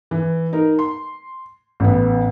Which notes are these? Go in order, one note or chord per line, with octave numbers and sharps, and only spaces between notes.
E3
D#4 A#4
C6
A1 B3